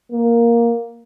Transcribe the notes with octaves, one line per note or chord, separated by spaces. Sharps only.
A#3